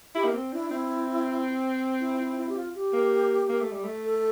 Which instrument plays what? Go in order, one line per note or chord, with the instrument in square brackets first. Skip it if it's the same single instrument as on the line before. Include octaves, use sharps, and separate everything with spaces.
[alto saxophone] E4 [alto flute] G4
[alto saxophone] A#3
C4
[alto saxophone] D4 [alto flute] E4
[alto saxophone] C4 [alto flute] E4
[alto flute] E4
E4
E4
G4
F4
G4
[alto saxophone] A#3
A#3
A3
G3
A3
[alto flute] A4